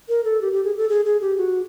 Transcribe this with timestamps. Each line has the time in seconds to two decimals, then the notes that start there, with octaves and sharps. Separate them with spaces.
0.09 A#4
0.24 A4
0.41 G4
0.53 G4
0.65 G#4
0.77 A4
0.89 G#4
1.05 G#4
1.21 G4
1.37 F#4